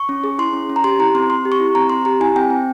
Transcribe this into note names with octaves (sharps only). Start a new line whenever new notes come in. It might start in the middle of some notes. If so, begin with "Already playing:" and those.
Already playing: C#6
C#4
G#4
E4 C6
C#4
C#4
A#5
G4 C6
E4 A#5
C4 C6
C4 C6
G4
C#6
E4
C4 A#5
C4 C6
G4 A#5
E4 G#5
C4 G5
C4